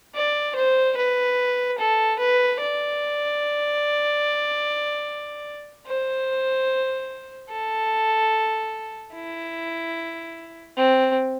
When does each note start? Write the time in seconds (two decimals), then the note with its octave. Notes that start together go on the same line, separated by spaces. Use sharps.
0.15 D5
0.56 C5
0.97 B4
1.78 A4
2.19 B4
2.60 D5
5.87 C5
7.50 A4
9.14 E4
10.77 C4